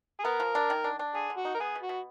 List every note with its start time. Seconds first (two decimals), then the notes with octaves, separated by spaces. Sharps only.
0.20 G#4
0.24 B3 A#4
0.40 F3
0.55 D4
0.70 D#3
0.84 D4
0.99 D4
1.15 D3 G#4
1.30 D3
1.37 F#4
1.45 D#4
1.54 A#4
1.60 B3 G#4
1.75 B2
1.83 F#4
1.89 B2